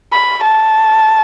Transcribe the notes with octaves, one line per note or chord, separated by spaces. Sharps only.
B5
A5